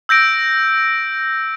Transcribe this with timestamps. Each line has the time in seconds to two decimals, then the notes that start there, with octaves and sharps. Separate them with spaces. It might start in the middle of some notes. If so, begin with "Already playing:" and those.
0.09 E6 G6 A#6 D7